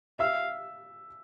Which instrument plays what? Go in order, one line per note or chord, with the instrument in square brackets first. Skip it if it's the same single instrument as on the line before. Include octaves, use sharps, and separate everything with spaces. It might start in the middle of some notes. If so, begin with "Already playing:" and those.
[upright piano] E5 E6 [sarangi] F5